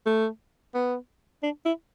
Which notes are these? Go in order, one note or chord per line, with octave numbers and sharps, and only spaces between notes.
A3
B3
D4
E4